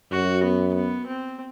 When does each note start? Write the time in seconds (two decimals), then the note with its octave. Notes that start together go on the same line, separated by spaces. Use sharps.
0.11 F#2 F#4
0.43 B3
0.74 B3
1.07 C4